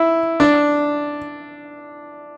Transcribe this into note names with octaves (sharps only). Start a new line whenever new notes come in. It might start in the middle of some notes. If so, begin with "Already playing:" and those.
Already playing: E4
D4